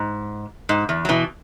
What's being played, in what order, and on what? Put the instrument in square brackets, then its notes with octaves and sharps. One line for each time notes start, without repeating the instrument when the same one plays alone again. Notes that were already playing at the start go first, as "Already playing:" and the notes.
Already playing: [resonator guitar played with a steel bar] G#2
G#2
E2
F#3
B2 E3